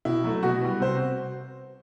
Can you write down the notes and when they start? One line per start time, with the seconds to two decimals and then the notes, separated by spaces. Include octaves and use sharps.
0.05 B2 E4
0.24 F#3 A3
0.43 B2 F#4
0.62 G3 B3
0.80 C3 C5